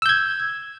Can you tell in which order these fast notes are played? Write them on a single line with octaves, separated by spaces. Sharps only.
E6 G6 G#6